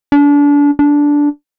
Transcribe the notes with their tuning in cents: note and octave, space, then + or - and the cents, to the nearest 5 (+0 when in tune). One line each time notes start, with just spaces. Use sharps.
D4 -30
D4 -10